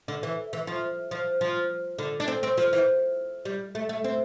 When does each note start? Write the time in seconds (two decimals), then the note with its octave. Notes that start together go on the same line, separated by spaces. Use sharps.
0.08 D3
0.23 E3
0.53 E3
0.67 F3
1.11 F3
1.41 F3
1.98 D3
2.20 D4
2.28 C4
2.43 C4
2.57 F3
2.73 E3
3.45 G3
3.75 A3
3.89 A3
4.04 C4